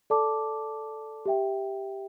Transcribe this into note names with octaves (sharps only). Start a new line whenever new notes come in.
A4 D5 A5 D6
G4 E5 G5